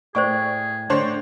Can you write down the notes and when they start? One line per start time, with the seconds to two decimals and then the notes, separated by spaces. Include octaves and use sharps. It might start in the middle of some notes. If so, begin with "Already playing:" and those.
0.15 A2 G#4 C5 D5 G5 C#6
0.90 A2 D3 D4 C5 C#5